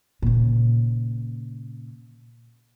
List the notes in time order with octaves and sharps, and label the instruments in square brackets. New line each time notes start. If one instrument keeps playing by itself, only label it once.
[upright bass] A#2 C#3